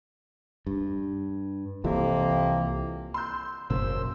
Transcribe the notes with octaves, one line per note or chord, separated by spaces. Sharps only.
G2
C2 F2 C3 E3 A#3
C6 E6 G6
F#1 A#2 A#3 C#4 C5 E6